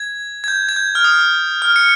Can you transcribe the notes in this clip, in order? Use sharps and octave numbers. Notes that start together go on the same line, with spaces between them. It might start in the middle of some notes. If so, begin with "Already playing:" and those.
Already playing: G#6
G#6
G6
G#6
G6
F6
D#6
F6
C#7